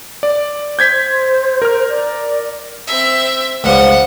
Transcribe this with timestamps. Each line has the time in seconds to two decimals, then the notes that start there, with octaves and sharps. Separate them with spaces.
0.23 D5
0.79 C5 G6 G#6 B6
1.62 A#4 F6
1.89 D5
2.87 C4 E5
3.64 C#2 F3 G3 F#5